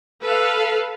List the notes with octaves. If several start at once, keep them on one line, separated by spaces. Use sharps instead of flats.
A4 B4 F5